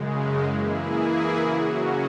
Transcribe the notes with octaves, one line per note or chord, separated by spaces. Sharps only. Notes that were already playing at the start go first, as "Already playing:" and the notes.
Already playing: F#2 C#3 G#3
E3 A#3 E4 G#4
C#3 F#3 C#4 F#4